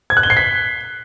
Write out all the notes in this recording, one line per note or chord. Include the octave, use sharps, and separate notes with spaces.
G#6
F#6
G7
C7
B6